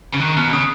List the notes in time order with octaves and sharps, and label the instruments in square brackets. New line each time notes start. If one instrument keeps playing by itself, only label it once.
[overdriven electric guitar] C#3
[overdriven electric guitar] D#3 [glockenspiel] F#6
[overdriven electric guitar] B2 [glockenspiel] F6
[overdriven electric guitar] C#3 [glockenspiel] D#6